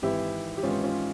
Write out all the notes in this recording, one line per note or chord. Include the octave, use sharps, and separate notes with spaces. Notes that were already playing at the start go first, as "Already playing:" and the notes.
G#1 G#2 E3 E4 G4
G4
G#1 G#2 E3 C#4 F4
C#4 F4